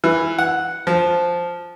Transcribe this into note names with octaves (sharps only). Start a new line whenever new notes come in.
E3
F#5
F3